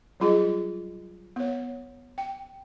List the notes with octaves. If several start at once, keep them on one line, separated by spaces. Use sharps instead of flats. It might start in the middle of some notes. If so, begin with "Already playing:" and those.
F#3 G3 F4 G#4 D#5
B3 C#5
G5